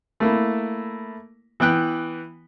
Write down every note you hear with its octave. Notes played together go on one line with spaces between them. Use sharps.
A3 A#3 E4
E3 B3 G5 F#6